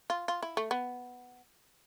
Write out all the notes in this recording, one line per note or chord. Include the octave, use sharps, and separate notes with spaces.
F4
F4
E4
A3
B3